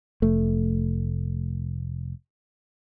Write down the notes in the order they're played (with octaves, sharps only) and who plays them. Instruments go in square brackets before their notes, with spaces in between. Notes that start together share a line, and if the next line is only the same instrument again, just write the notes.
[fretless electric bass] F1 A3